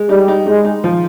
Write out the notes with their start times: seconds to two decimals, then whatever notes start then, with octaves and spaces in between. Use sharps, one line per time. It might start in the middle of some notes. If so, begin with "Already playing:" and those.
Already playing: G#3
0.09 G3 D#4
0.28 D#4
0.46 G#3 D#4
0.65 D#4
0.84 F3